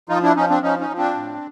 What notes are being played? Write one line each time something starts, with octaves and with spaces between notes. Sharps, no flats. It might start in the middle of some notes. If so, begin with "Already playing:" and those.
F3 D#4 F4
D4 E4
F3 C#4 D#4
C4 D4
F3 C#4 D#4
C#4 D#4
F3
C4 D4
A2